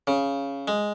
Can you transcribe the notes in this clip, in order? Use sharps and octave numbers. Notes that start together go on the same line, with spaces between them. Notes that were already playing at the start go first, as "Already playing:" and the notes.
C#3
G#3